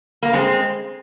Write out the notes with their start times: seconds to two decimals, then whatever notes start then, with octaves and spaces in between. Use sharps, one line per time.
0.23 A#3
0.33 G#3 C4